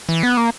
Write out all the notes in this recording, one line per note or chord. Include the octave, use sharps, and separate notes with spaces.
E3
B3
A#3